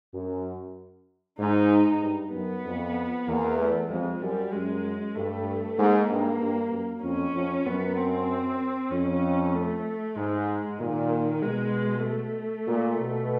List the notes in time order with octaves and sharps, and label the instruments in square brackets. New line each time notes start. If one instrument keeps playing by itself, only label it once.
[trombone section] F#2
[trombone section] G#2 [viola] D#4
[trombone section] G2
[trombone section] F#2 [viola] B3
[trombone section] F2
[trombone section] E2 [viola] A#3
[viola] A3
[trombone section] F2 [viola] G#3
[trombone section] F#2 [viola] G3
[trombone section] F#2 [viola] G#3
[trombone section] G2 [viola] A3
[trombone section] G#2 [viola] A#3
[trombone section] G2
G2
F#2
[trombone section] F2 [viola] C#4
[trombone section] F2
[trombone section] F#2 [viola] B3
[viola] C4
[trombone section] F2 [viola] C#4
[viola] A3
[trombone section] G#2 [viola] G#3
[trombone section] A#2 [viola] D#3
[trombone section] B2 [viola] G#3
[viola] A3
[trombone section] A#2
B2